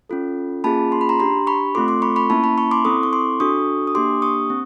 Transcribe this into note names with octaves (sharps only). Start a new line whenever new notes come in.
C#4 F4 A4
A#3 C#4 F4 G#4 A5 B5
C6
B5
A#5 C6
D4 G4 A#5 C6
B5 C#6
A3 C4 F4 A4 C6 D6
C6 D6
B5 C#6
B5 C#6
A#3 C#4 E4 A5 B5
A5 B5
B5 C#6
C6 D6
C4 E4 A4 C#6 D#6
C#6
C6 D6
D4 F#4 A4 C#6 D#6
D#6
A#3 D4 G4 C6 D6
C#6 D#6
C4